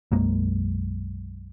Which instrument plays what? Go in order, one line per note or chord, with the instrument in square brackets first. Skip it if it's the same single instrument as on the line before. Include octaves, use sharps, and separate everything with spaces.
[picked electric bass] B1 F#2 G#3 A#3